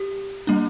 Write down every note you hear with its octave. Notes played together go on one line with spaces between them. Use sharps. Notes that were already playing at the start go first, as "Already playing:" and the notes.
Already playing: G4
G3 A#3 D4